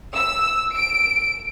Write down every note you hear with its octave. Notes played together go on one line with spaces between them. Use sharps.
E6
D7